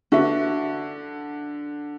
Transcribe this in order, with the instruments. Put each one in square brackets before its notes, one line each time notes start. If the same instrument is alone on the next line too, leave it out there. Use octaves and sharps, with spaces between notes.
[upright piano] D3 [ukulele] F#4 B4 E5